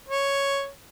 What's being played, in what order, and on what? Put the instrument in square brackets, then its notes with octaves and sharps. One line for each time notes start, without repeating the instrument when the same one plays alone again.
[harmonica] C#5